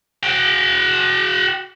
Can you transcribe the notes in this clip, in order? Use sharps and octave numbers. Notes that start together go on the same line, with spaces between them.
F#4 G5